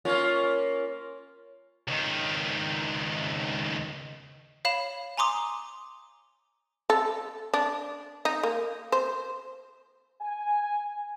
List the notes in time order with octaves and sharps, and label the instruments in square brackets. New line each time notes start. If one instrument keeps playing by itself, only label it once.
[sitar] A#3 C#4 F4
[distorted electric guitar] C#2 D#3
[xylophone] C#5 F5 B5 E7
G#5 A#5 C6 D6 D#6
[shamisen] A4
D4
D#4
A#3
C5
[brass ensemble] G#5